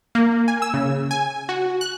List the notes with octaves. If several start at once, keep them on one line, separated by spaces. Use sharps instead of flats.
A#3
G#5
E6
C#3
G#5
F#4
F#6